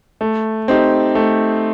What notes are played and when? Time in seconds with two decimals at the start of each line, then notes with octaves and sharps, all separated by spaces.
0.21 A3
0.68 C4 D#4 G4
1.15 A3